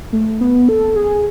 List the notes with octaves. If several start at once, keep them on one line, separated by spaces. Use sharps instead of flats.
A3
B3
A4
G#4